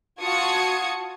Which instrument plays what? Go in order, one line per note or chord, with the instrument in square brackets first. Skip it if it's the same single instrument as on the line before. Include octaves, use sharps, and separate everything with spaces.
[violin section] F4 F#4 A5 D#6 G#6 C#7